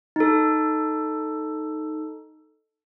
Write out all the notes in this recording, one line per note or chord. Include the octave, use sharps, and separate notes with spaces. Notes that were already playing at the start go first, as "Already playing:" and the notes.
D#4 A4